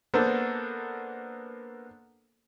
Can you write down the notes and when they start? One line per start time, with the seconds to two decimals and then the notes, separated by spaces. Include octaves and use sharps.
0.14 A#3 B3 D4 A4 C5